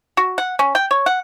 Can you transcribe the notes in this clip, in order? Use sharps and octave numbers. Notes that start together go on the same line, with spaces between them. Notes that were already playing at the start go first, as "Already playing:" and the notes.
F#4
F#5
C#4
G5
C#5
F#5